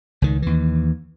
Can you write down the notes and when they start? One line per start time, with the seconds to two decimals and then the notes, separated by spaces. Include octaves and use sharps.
0.22 C#2 D#3
0.42 D#2 E3